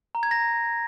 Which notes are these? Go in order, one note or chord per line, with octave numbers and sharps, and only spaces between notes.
A#5
G#6
A#6